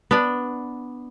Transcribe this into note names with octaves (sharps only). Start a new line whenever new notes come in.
B3 D4